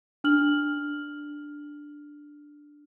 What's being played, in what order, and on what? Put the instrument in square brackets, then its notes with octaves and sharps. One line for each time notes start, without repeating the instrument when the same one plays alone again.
[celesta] D4 F6 F#7